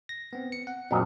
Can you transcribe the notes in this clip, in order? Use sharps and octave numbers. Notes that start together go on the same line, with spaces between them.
A#6
B3 C4
C#7
F#5
A#1 F#2 A#2 A#3 C4 D#5